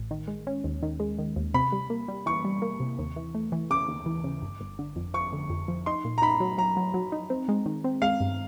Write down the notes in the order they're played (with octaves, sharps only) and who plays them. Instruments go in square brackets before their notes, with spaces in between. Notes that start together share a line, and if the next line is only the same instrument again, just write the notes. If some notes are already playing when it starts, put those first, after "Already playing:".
Already playing: [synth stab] A1
D#3
G#3
C#4
D#2
D#3
G#3
D#3
D#2
[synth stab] C3 [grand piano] B5
[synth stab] G3
A#3
G3
[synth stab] E3 [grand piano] C#6
[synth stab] G3
A#3
C3
D#2
E3
A3
E3
[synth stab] C#3 [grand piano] D6
[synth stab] D#2
E3
C#3
G1
G1
D3
F2
[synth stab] F3 [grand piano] C#6
[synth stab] D3
F2
F3
[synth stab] D#4 [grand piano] C6
[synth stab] A#2
[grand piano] A#5
[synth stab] D#4 [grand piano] B5
[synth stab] F#3
[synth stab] F#3 [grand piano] A#5
[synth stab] F#3
F#3
D#4
C4
G#3
D#3
C4
[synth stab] G#3 [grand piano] F5
[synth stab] G2